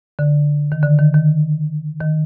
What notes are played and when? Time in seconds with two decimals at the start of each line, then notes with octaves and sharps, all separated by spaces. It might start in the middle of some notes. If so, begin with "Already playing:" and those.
0.19 D3
0.72 D#3
0.83 D3
0.99 D#3
1.15 D#3
2.01 D#3